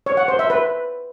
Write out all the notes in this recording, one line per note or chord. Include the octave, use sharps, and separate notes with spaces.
C#5
F#5
C5
E5
B4